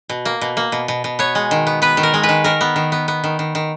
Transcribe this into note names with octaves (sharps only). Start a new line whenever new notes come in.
B2
A#3
B2
A#3
B2
B2
B2
B3 C#5
G#3
D#3
B3
B3 B4
D#3
A#4
G#3
B4
D#3
D#3 A#4
B3
D#3
B3
B3
D#3
D#3
D#3